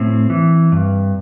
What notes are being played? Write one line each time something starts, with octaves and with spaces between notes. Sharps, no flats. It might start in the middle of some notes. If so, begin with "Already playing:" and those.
Already playing: A2 C4
E3
G2